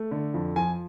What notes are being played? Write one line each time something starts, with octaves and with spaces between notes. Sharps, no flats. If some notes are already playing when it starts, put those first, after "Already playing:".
Already playing: A3
D3
F2
F3 G#5